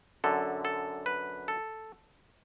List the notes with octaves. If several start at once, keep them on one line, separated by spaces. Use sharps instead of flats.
F#2 D3 A4
A4
B4
A4